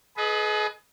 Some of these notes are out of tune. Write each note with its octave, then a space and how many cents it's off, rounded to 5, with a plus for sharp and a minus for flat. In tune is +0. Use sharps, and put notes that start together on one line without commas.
G#4 +40 B4 +0 D#5 +0